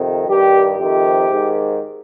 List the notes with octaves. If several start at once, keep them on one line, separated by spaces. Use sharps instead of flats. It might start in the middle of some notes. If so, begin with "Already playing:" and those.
Already playing: F2 C3 D#3
G2 D#3 G4
F2 C3 D#3 G4
G#2 D#3